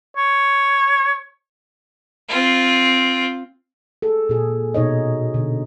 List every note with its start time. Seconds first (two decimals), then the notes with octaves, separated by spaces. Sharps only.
0.17 C#5
2.29 C4 F4
4.02 G#4 A4
4.29 A#2 G#4
4.74 B2 D#4 C#5 D#5
5.34 B2 D3